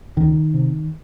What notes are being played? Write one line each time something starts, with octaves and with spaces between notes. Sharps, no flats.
C#2 D#3
C3